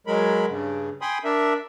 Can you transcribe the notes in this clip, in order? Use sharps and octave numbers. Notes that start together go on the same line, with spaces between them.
F#3 G#3 A#4 B5
G2 C#3
G5 G#5 B5 C6 D#6
D4 A#4 E5